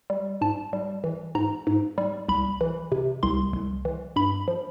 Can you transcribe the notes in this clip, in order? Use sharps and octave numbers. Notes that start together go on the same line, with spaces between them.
G3
G#2 A5
G3
E3
G#2 A#5
G#2
G3
C2 B5
E3
C3
C2 C6
C2
E3
G2 B5
F3